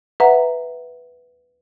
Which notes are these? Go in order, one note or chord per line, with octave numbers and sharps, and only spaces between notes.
B4 E5 F#5 A#5